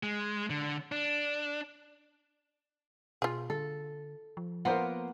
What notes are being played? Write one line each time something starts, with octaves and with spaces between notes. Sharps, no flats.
G#3
D3
D4
B2 F4 G#4
D3 A4
F3
A#3 B3 F4 A#4 C5 F#5